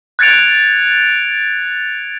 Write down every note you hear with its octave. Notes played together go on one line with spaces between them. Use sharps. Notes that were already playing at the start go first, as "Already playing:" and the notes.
F#6 G#6 A6 C#7 D7 F7